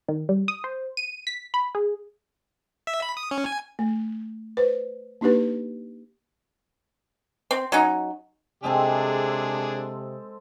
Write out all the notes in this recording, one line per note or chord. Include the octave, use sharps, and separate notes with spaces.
D#3
G3
D#6
C5
D#7
B6
B5
G#4
E5
B5
D#6
C#4
G#5
A3
B4 C5
A#3 D4 D#4 G4 B4
C4
F#3 C#4 D#4
C3 G#3 C4 D4 G#4 A4